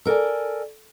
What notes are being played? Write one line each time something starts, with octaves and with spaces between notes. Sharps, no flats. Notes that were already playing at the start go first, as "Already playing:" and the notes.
A4 A#4 C#5 D5 G#5